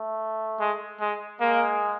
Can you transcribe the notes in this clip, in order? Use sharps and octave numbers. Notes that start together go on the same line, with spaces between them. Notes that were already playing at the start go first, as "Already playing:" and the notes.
Already playing: A3
G#3
G#3
G#3 A#3